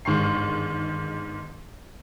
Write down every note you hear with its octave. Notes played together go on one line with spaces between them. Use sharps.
G1 G#2 D#3 C6 C#6 C7